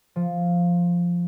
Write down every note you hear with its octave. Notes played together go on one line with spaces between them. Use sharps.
F3